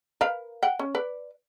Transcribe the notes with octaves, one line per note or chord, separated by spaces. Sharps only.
A#4 B4 F5
F#5 G5
C#4
B4 D5